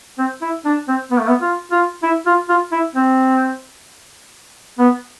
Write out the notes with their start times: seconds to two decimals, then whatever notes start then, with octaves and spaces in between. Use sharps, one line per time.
0.18 C4
0.42 E4
0.65 D4
0.88 C4
1.11 B3
1.19 A3
1.28 B3
1.42 F4
1.71 F4
2.03 E4
2.26 F4
2.49 F4
2.72 E4
2.95 C4
4.79 B3